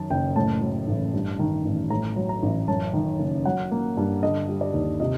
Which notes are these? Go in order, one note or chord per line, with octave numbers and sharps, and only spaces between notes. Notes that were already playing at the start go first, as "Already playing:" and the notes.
Already playing: F#2 D#3 A5
F#1 G5
A2 A5
F#3
A1
G2
D#3
A1
A2 A#5
F#3
A#5
A1
F#2 A5
D#3
F#1
F#3 F#5
A#3
G2
D3 D#5
G3
D5
D#2
C3 D#5